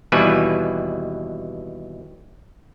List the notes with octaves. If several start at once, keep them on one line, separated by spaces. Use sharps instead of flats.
D#2 B2 E3 G3 B4 G#5